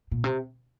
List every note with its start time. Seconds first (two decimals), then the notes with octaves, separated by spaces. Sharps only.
0.11 A#2
0.24 C3